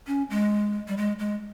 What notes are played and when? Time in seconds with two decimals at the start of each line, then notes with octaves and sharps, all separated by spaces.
0.07 C#4
0.30 G#3
0.88 G3
0.97 G#3
1.19 G#3